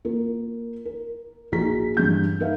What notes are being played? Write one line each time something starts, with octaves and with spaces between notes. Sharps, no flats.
A#3 F4 A#4
A#4
A#1 D#4 F#4 G#4 A#5 B6
G2 E3 G3 G6
D#4 A#4 B4 E5 F5